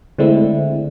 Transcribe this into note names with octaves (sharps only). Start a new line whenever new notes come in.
D3 G#3 A3 C4 D4 E4